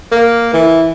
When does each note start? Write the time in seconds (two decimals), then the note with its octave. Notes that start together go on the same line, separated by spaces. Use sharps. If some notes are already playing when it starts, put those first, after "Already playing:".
0.12 A#3
0.53 E3